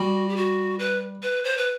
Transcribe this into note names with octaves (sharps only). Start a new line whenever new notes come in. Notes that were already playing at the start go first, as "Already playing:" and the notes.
Already playing: G3 F#4
G4
F#4
B4
B4
C5
B4